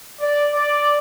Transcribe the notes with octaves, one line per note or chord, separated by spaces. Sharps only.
D5
D5